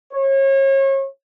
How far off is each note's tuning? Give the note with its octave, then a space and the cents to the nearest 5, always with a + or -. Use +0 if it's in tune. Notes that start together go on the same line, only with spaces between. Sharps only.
C#5 -35